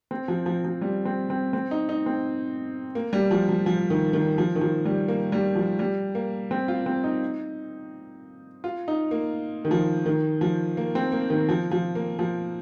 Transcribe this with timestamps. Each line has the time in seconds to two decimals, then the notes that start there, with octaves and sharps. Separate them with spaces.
0.11 C4
0.28 F3
0.46 F3
0.65 F3
0.81 G3
1.05 C4
1.30 C4
1.53 C4
1.71 D#4
1.89 D#4
2.06 C4
2.95 A#3
3.13 G3
3.31 F3
3.49 F3
3.66 F3
3.90 D#3
4.13 D#3
4.38 F3
4.55 D#3
4.61 F3
4.85 G3
5.08 A#3
5.32 G3
5.56 F3
5.79 G3
6.15 A#3
6.51 C4
6.68 F4
6.86 C4
7.04 D#4
8.64 F4
8.88 D#4
9.11 A#3
9.65 D#3
9.71 F3
10.06 D#3
10.41 F3
10.77 A#3
10.95 C4
11.12 A#3
11.30 D#3
11.49 F3
11.71 F3
11.95 A#3
12.19 F3